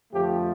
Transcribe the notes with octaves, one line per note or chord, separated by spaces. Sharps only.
F2 D3 F3 A3 G4